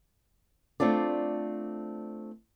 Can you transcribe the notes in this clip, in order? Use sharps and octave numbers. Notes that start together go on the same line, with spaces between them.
A3 C4 D4 F4 D5